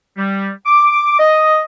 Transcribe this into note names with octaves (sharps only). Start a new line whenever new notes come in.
G3
D6
D#5